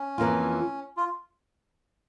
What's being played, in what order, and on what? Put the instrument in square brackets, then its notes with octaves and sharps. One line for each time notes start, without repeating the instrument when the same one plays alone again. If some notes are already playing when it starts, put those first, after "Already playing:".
Already playing: [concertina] C#4
[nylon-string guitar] F2 E3 A#3 F4
[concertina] F4